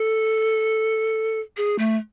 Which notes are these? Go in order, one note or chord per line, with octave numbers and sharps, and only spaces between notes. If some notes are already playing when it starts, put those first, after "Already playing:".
Already playing: A4
G#4
A3